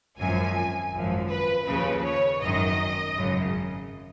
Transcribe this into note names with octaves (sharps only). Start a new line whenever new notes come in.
G#1 F#2 F3 G#5
G#1 F#2 F3
B4
D#2 C#3 F3 B4
C#5
G#1 F#2 D#3 D#5
G#1 F#2 C#3